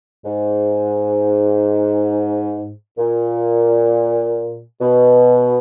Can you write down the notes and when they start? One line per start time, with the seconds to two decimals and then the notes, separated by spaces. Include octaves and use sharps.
0.25 G#2
2.98 A#2
4.80 B2